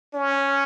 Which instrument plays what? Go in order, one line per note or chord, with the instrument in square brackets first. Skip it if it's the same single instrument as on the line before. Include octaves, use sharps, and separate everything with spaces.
[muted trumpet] C#4